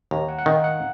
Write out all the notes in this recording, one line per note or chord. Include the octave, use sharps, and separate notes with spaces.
D#2 A#5
F#5
F#5
D#3 F5
F#5